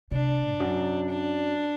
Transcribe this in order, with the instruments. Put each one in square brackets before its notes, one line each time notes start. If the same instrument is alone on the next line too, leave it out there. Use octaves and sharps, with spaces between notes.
[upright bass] C3 [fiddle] D4
[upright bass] E2
F#2
[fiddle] D4